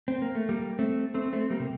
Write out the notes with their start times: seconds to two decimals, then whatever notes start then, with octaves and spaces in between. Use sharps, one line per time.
0.08 C4
0.22 A#3
0.35 A3
0.49 G3 A#3
0.79 A3 C4
1.14 A3 C4
1.33 A3 C4
1.50 G3 A#3
1.60 C3